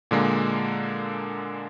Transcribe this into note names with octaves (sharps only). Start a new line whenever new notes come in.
A#2 D3 G#3 A#3